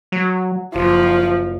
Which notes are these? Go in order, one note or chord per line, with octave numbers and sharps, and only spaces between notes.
F#3
F#1 F3